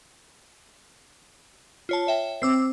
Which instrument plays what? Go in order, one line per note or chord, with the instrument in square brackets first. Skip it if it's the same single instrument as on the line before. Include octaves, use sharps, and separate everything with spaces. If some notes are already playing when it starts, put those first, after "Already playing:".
[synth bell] F4 C#5 A5
C#5 E5 G5
[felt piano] C4 [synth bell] D6 E6 C7